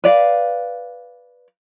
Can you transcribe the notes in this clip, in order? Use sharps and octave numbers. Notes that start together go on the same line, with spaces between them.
B4 D5 F5